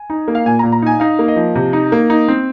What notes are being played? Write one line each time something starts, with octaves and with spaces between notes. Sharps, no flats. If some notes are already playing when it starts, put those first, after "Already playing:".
Already playing: G#5
D#4
A#3
F5
A#2 G#5
A#5
A#2
A#5
D#4 G#5
D#4 F5
A#3
D#5
F3
C3
D#4
A#3
D#4
C4